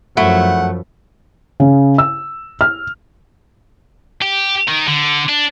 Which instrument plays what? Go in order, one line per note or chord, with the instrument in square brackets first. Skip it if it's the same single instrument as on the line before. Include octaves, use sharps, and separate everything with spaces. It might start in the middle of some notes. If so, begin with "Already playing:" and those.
[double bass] F#2 F3 [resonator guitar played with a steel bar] A3 [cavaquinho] E4 [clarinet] F#5
[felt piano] C#3
E6
F6
[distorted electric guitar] G4
D#3
D3
D4